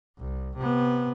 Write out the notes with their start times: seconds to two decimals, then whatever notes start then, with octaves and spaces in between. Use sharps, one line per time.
0.18 C2
0.57 C3 B3